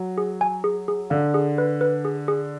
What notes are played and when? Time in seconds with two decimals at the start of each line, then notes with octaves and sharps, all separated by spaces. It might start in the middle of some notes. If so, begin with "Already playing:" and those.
Already playing: F#3
0.18 G#4
0.41 G#5
0.64 G#4
0.88 G#4
1.10 D3 F5
1.34 G#4
1.58 B4
1.81 B4
2.05 G#4
2.28 G#4